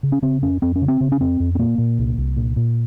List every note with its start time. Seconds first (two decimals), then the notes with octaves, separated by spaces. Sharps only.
0.03 C#3
0.12 C#4
0.22 C#3 C4
0.42 F2 C#4
0.62 F2 C4
0.76 C#4
0.82 C#3
0.88 C4
1.01 C#3
1.12 C#4
1.20 F2 C4
1.40 F2
1.55 C4
1.59 A#2 A#3
1.78 A#2
1.98 C2
2.18 C2
2.37 A#2
2.56 A#2